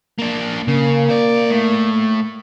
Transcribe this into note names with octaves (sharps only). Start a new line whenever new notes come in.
A#3 D4
C#3 A#3
C5 D5
A2